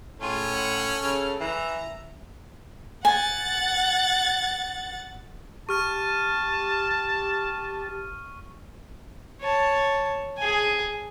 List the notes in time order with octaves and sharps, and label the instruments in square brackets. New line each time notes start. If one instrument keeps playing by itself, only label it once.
[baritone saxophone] A2 [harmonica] C#4 [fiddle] F4 G#4 [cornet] A4
[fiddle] F#5
[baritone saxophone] C#3 [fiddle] F6
[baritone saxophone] E3 [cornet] E5 [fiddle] A#5
[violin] F#5 A6 [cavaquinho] G#5
[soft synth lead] G4 [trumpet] A5 [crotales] C#6 F6 D#7
[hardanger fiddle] C#5 A5
G#4 G#5